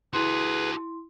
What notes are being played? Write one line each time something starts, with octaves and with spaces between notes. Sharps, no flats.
E4 F#4 G#4 A4 B4 C6